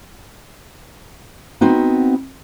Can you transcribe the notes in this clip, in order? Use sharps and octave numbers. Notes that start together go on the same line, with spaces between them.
B3 C4 D#4 F#4